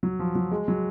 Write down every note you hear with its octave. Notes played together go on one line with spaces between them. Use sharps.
F#3
F3
F#3
G#3
F#3